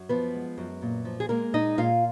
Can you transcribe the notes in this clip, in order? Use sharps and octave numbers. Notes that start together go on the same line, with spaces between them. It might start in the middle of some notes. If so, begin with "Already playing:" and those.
Already playing: F#2
F3 B3 B4
G#3
F#2
A#2
F3
G#4
G#3 A#3 A#4
A#2 D#4 D#5
A#2 F4 F5